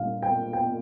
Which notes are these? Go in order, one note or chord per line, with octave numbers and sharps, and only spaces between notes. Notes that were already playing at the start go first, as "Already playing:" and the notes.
Already playing: A#2 G3 D4 F5
G5
G5